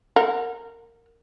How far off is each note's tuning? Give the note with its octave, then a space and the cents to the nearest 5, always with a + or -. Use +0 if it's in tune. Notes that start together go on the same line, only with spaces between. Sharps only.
A#4 -15 F#5 -25